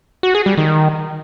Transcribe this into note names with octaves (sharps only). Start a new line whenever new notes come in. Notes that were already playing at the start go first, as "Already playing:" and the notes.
F#4
G#4
G3
D#3